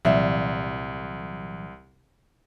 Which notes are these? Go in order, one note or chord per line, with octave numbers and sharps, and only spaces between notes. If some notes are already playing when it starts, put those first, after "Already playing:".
C2 A#2 E3 F#3 D5 E5 F5